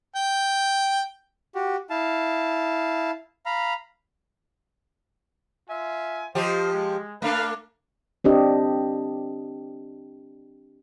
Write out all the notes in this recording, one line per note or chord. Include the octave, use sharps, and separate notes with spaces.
G5
F#4 G4
E4 F5 A5
F5 A#5 B5
F4 E5 G#5
F3 G4 C5 D#5
G#3
A3 A#3 D4 B4 F5
C4 D4 G4 D#5